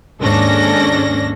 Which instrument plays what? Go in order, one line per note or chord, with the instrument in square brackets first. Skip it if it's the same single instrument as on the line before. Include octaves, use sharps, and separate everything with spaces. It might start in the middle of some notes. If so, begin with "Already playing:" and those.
[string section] D#2 G#2 C#4 D4 A4 A#6